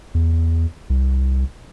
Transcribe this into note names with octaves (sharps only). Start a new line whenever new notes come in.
E2
C2